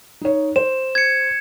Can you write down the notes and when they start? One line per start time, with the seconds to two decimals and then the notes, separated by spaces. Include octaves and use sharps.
0.21 D#4 C#5
0.56 C5 E7
0.95 G#6 C#7